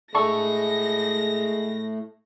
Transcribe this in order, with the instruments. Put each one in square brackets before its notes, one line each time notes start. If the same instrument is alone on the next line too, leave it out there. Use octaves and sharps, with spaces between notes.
[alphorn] G#3 [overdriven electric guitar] A3 E4 [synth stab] D4 A4 C#6 [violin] A#6